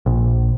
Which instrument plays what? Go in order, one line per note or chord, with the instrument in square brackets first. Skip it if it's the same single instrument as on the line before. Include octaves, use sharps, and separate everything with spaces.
[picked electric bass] A#1